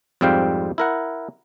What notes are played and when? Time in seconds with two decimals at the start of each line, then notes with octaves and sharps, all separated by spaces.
0.21 F2 G#2 G3 C4 F5 G5
0.78 E4 A#4 F#5